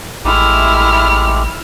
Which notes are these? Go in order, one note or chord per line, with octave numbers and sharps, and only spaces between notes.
A1 G#3 A3 E4 G4 F6